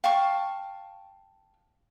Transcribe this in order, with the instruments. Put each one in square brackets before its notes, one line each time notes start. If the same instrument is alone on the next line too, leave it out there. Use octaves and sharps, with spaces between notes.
[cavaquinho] F5 G5 A5 C#6